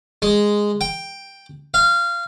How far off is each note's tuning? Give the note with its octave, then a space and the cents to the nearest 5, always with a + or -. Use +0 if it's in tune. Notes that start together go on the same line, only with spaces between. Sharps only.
G#3 -5
G5 +5
F5 -20